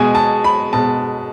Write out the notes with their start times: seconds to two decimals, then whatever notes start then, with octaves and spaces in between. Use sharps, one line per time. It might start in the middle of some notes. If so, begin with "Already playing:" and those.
Already playing: B2 G#3 G#5
0.15 A5
0.44 B5
0.73 B2 G#3 A5